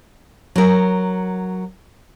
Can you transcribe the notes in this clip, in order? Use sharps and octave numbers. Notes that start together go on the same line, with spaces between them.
F#3 A#4